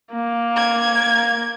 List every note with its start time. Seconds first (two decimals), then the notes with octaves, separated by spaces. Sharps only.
0.13 A#3
0.57 G#6